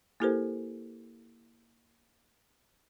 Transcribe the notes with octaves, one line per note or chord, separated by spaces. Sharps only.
A#3 E4 G4 A4 A#4 C5